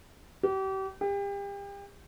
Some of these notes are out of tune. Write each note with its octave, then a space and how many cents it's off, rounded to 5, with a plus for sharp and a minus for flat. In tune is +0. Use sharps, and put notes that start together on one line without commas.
G4 -35
G4 +35